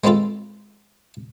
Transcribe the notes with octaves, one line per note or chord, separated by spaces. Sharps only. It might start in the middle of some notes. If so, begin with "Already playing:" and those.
G#3 B3 C4 F4 A4